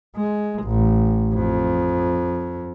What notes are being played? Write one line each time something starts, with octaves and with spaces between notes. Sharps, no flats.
G#3
A1
F2